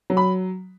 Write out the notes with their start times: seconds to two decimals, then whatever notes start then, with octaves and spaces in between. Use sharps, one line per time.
0.10 F#3
0.17 B5